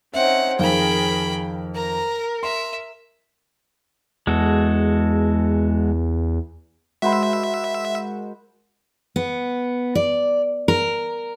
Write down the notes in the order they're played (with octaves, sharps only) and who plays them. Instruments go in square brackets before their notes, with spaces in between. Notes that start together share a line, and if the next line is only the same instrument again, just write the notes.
[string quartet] C4 C#4 D#4 [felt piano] E5 [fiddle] F#5
[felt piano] F2 D#3 F5 [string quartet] G#4 A#4 [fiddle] G5 B5
[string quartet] A#4 [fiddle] A#5
[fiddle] E5 [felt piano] C6
[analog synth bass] E2 [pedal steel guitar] G#3 F#4 A4
[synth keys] G#3 A#4 [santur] F#4 C5 B5 [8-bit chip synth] E5
[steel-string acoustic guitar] B3
D5
A#4